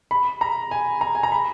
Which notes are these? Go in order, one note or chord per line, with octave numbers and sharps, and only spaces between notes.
B5
A#5
G#5
A#5
G#5
A#5
B5